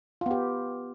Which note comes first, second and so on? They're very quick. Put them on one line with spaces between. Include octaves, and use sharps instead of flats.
F4 B3 G4